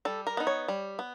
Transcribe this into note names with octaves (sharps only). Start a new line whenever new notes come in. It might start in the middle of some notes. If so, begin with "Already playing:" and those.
G3 A4
A#4
B3 D#4
C#5
G3
B3